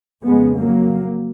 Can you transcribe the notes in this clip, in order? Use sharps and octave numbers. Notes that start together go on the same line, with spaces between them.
F2 C#3 G#3 B3
F#3 A#3